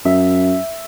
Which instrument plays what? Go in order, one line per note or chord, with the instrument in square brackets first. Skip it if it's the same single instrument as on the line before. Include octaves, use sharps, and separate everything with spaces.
[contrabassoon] F#2 [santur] E5